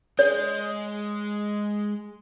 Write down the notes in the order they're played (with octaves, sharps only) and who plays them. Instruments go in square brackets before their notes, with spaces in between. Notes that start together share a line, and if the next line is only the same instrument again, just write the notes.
[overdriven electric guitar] G#3 [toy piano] C#5